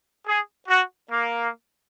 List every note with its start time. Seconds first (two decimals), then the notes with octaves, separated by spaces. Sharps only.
0.26 G#4
0.68 F#4
1.10 A#3